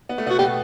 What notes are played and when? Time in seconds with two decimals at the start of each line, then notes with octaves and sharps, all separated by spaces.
0.09 B3
0.18 A3
0.26 B2 B3
0.30 F#4
0.39 B2 B3 G4